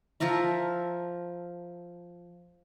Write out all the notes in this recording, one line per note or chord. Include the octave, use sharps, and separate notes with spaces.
F3 A4 A#4 E5